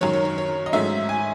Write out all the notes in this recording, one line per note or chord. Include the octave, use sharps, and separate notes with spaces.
F#2 D#3 F#3 C#5
C#5
C#5
C#5
D#5
G#2 F#3 A3 C#4 E5
G#5